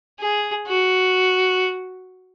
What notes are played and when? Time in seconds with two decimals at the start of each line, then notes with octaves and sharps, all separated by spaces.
0.20 G#4
0.67 F#4